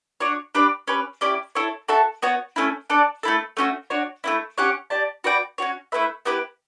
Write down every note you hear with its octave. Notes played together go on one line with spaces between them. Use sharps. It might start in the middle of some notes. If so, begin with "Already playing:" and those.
D4 F#4 C#5
D4 G4 B4 D5
C#4 G4 B4
C#4 E4 G4 D5
E4 A4 C#5
F#4 A4 E5 A5
B3 F#4 C#5
A3 C#4 E4
D4 A4 D5
A3 E4 A4
A3 C#4 F#4
D4 F#4 C#5
A3 C#4 E4
C#4 G4 C#5 F#5
G4 D5 A5
F#4 B4 D5 G5
C#4 F#4 C#5
A3 E4 B4 E5
B3 E4 G4 B4